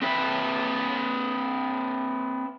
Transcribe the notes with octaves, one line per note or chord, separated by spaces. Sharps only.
C4 B4 E5